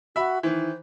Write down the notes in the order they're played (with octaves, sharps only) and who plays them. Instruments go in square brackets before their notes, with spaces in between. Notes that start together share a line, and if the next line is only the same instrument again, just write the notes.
[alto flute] F#4 [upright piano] E5 B5
[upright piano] D#3 E3 [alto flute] C5